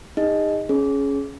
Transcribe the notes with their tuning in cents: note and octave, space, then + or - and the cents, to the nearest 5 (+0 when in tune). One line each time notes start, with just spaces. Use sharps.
D#4 +0 G#4 -35 D#5 +0
C#4 +0 G#4 +20